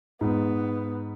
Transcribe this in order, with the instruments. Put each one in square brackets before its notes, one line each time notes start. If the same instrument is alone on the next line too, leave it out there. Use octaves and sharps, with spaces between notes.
[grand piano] G#2 [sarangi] B3